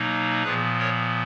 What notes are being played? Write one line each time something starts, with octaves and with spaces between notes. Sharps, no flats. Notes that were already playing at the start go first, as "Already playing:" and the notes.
Already playing: B2 F#3 A#3 D#4
A#2 F3 B3 G#4 B4
A#4 C#5